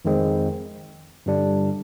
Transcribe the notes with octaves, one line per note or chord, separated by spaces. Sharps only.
F2 D#3 G#3 C4
G2 D3 G3 D4